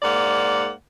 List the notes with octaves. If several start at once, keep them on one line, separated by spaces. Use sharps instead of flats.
G#2 A#3 D5 F#5